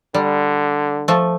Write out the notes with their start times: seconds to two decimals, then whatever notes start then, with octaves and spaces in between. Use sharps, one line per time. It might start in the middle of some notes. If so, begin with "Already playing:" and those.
0.14 D3 G3
1.08 F3 A3